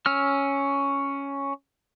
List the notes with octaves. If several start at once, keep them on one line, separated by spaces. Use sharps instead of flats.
C#4 E6 F6